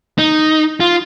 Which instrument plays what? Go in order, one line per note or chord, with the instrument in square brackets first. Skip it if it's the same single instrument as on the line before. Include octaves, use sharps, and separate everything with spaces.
[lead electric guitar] D#4
F4